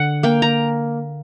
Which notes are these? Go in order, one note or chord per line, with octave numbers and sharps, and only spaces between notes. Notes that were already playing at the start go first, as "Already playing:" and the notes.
Already playing: D3 F#5
A#3 G5
A#5